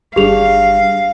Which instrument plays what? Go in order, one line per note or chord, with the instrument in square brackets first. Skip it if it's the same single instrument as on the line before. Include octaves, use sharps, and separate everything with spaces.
[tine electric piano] G1 G3 D4 [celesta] G4 G#4 F7 [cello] F5